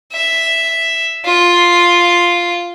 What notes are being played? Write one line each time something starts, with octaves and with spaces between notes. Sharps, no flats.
E5
F4